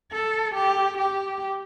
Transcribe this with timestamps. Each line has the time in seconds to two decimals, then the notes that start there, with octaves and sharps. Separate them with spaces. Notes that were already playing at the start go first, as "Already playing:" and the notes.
0.12 A4
0.55 G4
0.98 G4